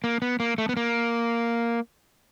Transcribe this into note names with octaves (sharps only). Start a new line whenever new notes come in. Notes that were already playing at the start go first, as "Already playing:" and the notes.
A#3
B3
A#3
A3
B3
A#3